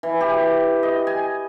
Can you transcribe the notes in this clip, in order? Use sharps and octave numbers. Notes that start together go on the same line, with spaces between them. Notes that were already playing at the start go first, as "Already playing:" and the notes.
E3
G4
D#5
G#5